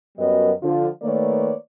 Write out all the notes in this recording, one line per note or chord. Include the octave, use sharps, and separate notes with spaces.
F#2 F#3 G3 B3 A#4 D#5
D3 F3 F4
D#3 A3 A#3 B4 C#5 D5